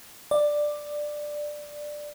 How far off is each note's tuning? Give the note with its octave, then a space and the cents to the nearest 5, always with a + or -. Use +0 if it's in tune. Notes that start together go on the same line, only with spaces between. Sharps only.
D5 +10